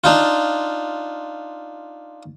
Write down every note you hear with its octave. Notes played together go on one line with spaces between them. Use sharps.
D4 D#4 F4